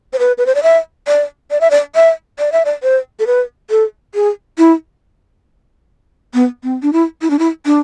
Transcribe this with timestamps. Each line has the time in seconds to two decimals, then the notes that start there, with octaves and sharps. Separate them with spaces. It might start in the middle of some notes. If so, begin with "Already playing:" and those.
0.13 C5
0.19 B4
0.38 B4
0.46 C5
0.55 D5
0.63 E5
1.07 D5
1.51 D5
1.61 E5
1.71 D5
1.95 E5
2.39 D5
2.52 E5
2.65 D5
2.83 C5
3.19 A4
3.27 B4
3.70 A4
4.15 G#4
4.58 E4
6.34 B3
6.63 C4
6.82 D4
6.93 E4
7.22 E4
7.30 D4
7.39 E4
7.66 D4